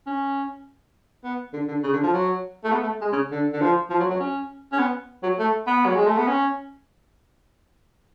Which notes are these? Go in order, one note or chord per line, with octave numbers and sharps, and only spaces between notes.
C#4
B3
D3
D3
C#3
D3
F3
F#3
A3
B3
A3
G#3
C#3
D3
D3
F3
F3
F#3
F#3
C#4
C#4
B3
F#3
A3
B3
F#3
G#3
A3
B3
C#4